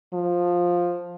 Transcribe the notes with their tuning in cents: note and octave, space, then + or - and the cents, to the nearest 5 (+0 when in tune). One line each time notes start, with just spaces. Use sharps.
F3 +10